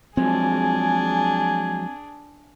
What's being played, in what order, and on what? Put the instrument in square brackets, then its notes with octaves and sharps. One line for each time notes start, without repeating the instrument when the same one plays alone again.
[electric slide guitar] F3 F#3 G#3 [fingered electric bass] C4 [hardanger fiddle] D4 G#4 [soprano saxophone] G#5